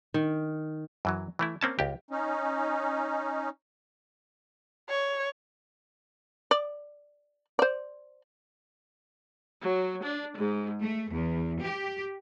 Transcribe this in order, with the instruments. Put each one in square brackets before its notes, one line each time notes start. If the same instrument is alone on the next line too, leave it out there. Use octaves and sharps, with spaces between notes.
[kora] D#3
[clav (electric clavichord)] F#2 E3 F#3
E3 A3 E4
A#3 C4 C#4 A5
C#2 G4
[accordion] C#4 D#4
[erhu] C#5
[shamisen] D5
C5 D5
[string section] F#3
D4
G#2
A3
E2
G4